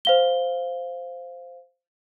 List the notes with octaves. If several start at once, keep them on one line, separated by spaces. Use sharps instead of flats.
C5 F5 G7